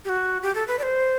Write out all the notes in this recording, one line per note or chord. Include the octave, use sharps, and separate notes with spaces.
G4
F#4
G4
A4
B4
D5
C5